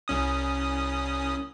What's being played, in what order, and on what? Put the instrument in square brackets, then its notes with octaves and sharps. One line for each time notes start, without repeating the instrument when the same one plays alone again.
[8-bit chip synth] C2 C#4 D#6